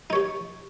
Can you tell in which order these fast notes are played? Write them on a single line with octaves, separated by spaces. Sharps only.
D#4 C#5 G4